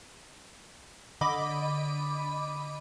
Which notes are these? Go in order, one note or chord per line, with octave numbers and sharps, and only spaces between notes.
D3 D#5 B5 D6